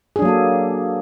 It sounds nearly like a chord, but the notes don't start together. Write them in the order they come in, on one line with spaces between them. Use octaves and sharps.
G#4 D4 F#3 A#3 A4